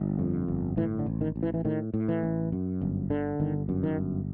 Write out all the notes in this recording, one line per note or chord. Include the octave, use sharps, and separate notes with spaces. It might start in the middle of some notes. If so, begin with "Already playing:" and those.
Already playing: G1
F2
G1
A2 E3
D3
A1
D#3
A1
E3
E3
A2 D#3
A2
E3
A1
F#2
G1
D3
G1 D#3
F#2
D#3
G1